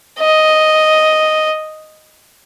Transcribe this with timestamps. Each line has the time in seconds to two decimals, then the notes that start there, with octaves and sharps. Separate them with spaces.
0.20 D#5